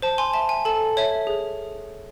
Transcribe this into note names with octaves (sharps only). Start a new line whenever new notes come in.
C5 A5
G#5 C6
E5 A5
G#5
A4 A5
C#5 E5
G#4